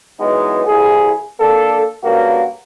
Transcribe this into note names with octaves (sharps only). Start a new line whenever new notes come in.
E3 F#3 G#3 B3 D#4
C2 E4 G#4
A#3 D4 A4
G2 C#3 A#3 F#4 A#4